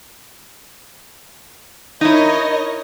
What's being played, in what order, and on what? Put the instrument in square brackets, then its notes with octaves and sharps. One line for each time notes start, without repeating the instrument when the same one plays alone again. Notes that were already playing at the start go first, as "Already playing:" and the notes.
[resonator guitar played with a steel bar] D#4 E4 [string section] A#4 C#5 D#5